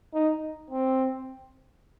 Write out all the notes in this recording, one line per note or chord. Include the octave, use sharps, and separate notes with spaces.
D#4
C4